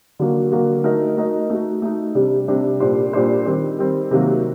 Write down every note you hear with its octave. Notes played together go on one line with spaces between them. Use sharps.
D3 F#3 A#3 F#4
D3 F#3 A#3 F#4
A3 D#4 F#4 A#4 D#5
A3 D#4 F#4 A#4 D#5
A3 D#4 F#4
A3 D#4 F#4
C3 G3 D4 G4
C3 G3 D4 G4
A#2 G3 D4 G4 C5
A#2 G3 D4 G4 C5
D#3 G3 C4
D#3 G3 C4
C3 D#3 F#3 A#3 F#4